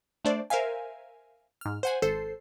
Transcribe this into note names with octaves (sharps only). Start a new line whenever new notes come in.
A3 D4 C5 D5
A#4 C5 E5 F5 G#5
G#2 F6
C5 F#5 G#5
G#1 A4 C5 C7